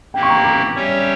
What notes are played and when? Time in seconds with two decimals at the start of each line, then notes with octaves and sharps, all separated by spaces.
0.14 E3 A#3 E4 G4 G5
0.23 C#6
0.30 A#5
0.44 D6
0.74 G3 C#4 G4 C#5 E5